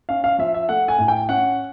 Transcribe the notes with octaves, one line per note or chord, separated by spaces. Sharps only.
C#4 F5
F5
F3 E5
E5
A3 F#5
G#5
A2
G5
C#4 F#5